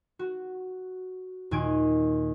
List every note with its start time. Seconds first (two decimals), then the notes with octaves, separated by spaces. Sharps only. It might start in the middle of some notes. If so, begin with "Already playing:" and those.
0.19 F#4
1.51 D#2 A#2 G#5 G#6 D7